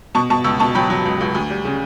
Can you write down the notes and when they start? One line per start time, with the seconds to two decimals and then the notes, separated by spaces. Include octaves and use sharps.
0.15 B2 A5 C#6
0.30 B2 A5 C#6
0.44 C#2 C#6 E6
0.59 B2 A5 C#6
0.75 F#3 G5 B5
0.90 F#3
1.05 C#2
1.21 C#2
1.34 D2
1.50 G3
1.65 C#3